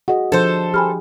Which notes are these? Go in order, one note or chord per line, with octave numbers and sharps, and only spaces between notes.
F#4 G#4 D#5 F#5
F3 D4 A4 C5
G4 G#4 G#5 B5 F6